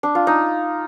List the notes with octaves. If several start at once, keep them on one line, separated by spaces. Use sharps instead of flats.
D4
F4
D#4